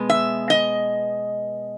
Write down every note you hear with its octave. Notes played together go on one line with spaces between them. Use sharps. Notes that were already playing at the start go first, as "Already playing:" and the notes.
Already playing: B2 G#3 B3
E5
D#5